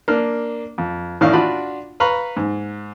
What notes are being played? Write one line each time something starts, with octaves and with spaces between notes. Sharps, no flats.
A#3 D4 F6
F2
A1 A2 D#3 D4 F5
D4 F4 F#4 D5 B5
B4 F5 A#5 B5 C#6
G#2